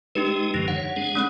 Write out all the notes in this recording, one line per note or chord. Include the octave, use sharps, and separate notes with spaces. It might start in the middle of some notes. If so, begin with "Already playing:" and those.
G#3 D4 D#4 G4 B4
F#2 D3 F3 A#6
C#5 F#5
G#3 D4 G#4
A3 C#4